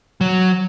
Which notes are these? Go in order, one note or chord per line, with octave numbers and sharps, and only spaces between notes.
F#3